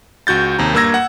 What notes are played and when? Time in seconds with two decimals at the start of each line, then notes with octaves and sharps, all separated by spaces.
0.27 C#2 F#4 G6 A6
0.59 D#2 C3 A#5
0.74 G2 A#3 A#5 E6 G#6 A#6
0.94 F#5